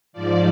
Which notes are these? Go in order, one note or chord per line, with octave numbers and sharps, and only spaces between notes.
G#2 F3 D5